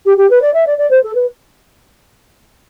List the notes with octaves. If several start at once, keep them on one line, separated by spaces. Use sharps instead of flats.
G4
G4
B4
D5
E5
D5
D5
C5
A4
B4